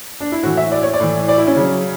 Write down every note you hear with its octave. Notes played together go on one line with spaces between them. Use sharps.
D4
E4
A2 E3 F#4
E5
D5
C#5
D5
A2 E3
D5
E4
C#4
C#3 F#3